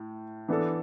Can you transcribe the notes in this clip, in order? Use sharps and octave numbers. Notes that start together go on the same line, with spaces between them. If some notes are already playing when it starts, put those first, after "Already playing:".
Already playing: A2
E3 B3 D4 A4